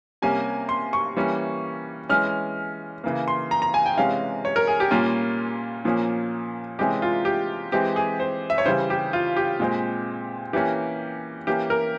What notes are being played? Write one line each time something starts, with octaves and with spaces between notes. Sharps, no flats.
C3 G3 A#3 C#4 G#5
C6
C#6
E3 G3 A#3 C#4
E3 G#3 C#4 F6
C#3 E3 A#3
C6
A#5
A#5
G#5
G5
C3 E3 G#3 C#4 F5
C#5
A#4
G#4
G4
A#2 G3 A#3 C#4 F4
A#2 F3 A#3 C#4
C3 E3 G#3 C#4 G4
F4
G4
E3 G#3 C4 G4
G#4
C5
E5
C#5
C#3 E3 G3 C5
G4
F4
G4
A#2 G#3 C4
E3 A#3 C#4 G4
E3 A#3 C#4 G4
A#4